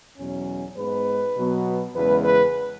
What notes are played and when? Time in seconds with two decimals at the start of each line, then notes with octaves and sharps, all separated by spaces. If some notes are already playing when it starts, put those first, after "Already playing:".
0.17 E2 B2 F#3 C#4
0.76 G#2 G#3 B3 B4
1.36 B2 F#3 B3
1.94 E2 C#3 G#3 B4
2.24 B4